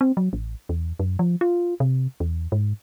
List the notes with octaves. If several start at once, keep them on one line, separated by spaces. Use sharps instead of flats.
C4
F#3
A1
E2
F#2
F3
F4
C3
E2
G#2